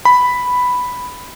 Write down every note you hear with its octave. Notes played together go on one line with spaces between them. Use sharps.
B5